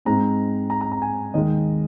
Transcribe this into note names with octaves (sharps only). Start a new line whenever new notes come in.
G#2 G#3 C4 A#5
A#5
A#5
A#5
G#5
D#2 D#3 G#3 D#5